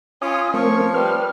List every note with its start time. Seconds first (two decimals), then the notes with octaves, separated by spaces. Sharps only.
0.22 C#4 F4 G#5 D#6
0.54 F3 A3 C4 A#4 C#5
0.94 G3 B4 F6